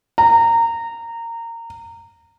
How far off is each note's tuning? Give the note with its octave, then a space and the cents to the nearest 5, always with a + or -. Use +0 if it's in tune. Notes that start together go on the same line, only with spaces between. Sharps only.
A#5 -20